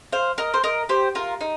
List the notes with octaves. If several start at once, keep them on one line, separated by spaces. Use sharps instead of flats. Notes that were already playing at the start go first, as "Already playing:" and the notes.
C5 F5
A#4 D#5
C5
A#4 D#5
G4 C5
F4 A#4
D#4